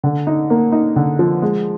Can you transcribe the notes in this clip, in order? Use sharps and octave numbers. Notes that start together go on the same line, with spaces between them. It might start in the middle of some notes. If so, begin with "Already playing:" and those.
D3
D#4
A#3
D#4
D3
F3
G#3